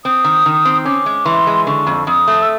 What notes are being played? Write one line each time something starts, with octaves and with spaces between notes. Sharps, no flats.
C4 D#6
D#3
D#3
C4
C#4 D6
G#3
E3 C6
G#3
D3 C#6
F2
F2 D#6
A3
E6